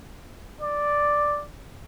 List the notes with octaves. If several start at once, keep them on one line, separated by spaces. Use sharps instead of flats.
D5